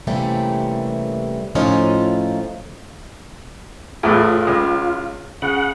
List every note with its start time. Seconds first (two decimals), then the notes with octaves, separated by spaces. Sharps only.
0.07 C3 E3 G3 A3 A#3 C#4
1.55 A2 F3 C#4 D#4 F4
4.03 E2 A2 A3 F4
4.47 C#2
5.42 C#3 F#5